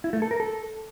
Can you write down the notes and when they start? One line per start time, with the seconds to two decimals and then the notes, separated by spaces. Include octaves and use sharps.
0.04 E4
0.13 A3
0.22 A4
0.31 A#4
0.40 A4